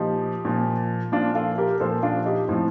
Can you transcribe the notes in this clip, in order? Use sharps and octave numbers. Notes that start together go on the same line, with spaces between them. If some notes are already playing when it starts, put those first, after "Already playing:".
Already playing: A#2 F3 D#4 G4
A#2 F3
A#2 F3 D4 F4
F4 A4
G4 A#4
A#2 F3 A4 C5
D4 F4
D#4 G4
A2 F3 C4